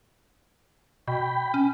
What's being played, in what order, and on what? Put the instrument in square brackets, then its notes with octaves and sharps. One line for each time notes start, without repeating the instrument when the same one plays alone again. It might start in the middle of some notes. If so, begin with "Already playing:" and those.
[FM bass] B2 [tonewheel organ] G5 B5
[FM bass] C#4